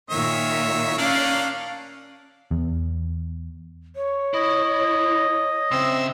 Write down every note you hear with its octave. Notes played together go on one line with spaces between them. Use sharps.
A#2 D#3 C#5 E5
A#3 C#4 D4 D5 F5
E2
C#5
E4 D#5
C#3 C4 E5 C6 E6